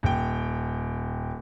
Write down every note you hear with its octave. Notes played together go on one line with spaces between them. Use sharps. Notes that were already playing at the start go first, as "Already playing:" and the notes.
D#1 G5